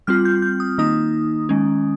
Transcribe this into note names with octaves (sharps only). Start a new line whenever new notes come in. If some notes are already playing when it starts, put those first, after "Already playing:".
G3 C4 F4 F6
G6
G6
D#6
D#3 A#3 D#4 D#6
D#3 G#3 C#4